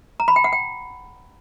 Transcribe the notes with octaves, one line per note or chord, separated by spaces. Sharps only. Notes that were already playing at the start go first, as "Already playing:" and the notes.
A#5
B5
G5
F#5
G5